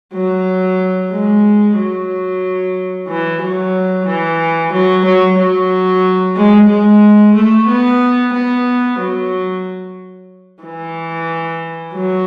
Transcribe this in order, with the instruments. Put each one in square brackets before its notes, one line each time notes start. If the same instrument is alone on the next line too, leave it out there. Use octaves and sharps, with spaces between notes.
[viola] F#3
G#3
F#3
E3
F#3
E3
F#3
F#3
F#3
G#3
G#3
A3
B3
B3
F#3
E3
F#3